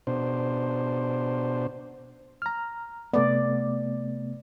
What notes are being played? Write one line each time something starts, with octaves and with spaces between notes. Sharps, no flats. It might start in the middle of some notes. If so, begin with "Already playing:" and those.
B2 D4 C5
A#5 F6
C3 A3 B3 D5